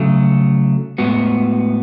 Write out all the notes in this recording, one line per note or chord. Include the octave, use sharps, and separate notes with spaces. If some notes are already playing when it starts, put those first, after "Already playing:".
Already playing: C#3 F#3 A3
A2 G#3 B3 F#4